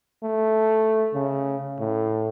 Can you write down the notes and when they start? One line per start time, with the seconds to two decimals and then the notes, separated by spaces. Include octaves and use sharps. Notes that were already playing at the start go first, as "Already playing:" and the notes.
0.24 A3
1.14 C#3
1.80 A2